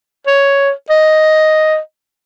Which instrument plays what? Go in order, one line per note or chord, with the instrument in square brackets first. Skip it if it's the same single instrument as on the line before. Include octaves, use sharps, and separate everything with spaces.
[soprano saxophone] C#5
D#5